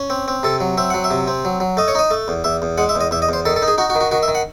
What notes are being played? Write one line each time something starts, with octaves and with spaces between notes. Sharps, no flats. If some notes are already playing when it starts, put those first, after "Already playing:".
Already playing: C#4
C4
C4
C3 A4
F#3
C4 E5
F#3 F#5
E5
C3
C4
F#3
F#3
A3 D#5
C#5
D#4 D#5
A3
E2
E2 E5
E2
G#3 F#5
E5
E2
D#5
E2 E5
D#5
E2 C5
D#3 A4
A4
D#4
G#4
D#4 F#4
F#4
D#3
F#4
D#3 F#4
E5
D#3
F#5